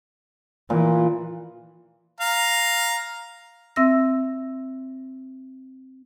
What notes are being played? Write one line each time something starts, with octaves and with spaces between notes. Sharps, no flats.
A#2 E3
F5 A#5
C4 E5 E6 A#6